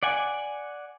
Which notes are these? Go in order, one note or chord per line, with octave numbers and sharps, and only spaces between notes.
D5 F#5 G#5